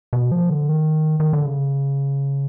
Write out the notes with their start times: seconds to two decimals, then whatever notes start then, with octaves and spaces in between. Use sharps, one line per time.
0.13 B2
0.32 F3
0.50 D3
0.69 D#3
1.20 D#3
1.33 D3
1.45 C#3